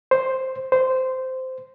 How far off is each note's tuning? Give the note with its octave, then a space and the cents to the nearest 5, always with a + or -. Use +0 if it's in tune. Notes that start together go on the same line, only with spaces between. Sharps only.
C5 +0
C5 -15